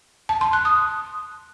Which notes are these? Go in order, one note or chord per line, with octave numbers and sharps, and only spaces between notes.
A5
C6
F#6
D#6